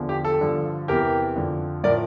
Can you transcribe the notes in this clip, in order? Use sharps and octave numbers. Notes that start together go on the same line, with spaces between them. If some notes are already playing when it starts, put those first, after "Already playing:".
Already playing: E2 D3 F3
G4
A4
G2 D3 F3
E2 C3 E3 G4 A#4
F2 D3 F3
A2 F3 A#4 D5